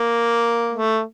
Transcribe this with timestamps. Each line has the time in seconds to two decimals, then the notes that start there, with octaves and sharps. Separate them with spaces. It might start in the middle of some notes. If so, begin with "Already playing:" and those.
Already playing: A#3
0.73 A3